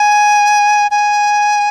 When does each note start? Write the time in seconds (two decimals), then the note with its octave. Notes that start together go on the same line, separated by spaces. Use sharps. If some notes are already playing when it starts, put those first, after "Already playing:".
Already playing: G#5
0.91 G#5